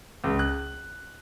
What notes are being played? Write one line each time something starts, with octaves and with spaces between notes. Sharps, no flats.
C#2
F#6